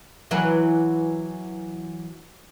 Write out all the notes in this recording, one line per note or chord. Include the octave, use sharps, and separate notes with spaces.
E3 F#3 B4